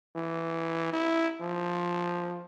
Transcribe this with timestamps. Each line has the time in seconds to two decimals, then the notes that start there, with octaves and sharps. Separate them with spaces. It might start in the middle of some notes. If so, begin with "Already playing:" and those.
0.15 E3
0.92 E4
1.40 F3